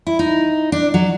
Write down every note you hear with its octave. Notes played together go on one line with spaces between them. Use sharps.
E4
D#4
D4
F#3